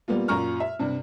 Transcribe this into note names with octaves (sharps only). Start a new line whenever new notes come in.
G3 A#3 B3 F4
F#2 A#2 F4 A#5 C#6 F6
E5
G2 C3